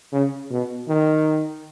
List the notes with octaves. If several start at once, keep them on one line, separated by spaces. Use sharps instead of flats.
C#3
B2
D#3